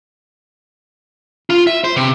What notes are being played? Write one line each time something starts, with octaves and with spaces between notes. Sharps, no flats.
F4
E5
C5
C3